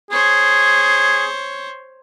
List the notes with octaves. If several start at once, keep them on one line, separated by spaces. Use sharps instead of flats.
G#4 C5 C#5